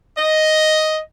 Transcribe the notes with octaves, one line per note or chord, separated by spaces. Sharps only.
D#5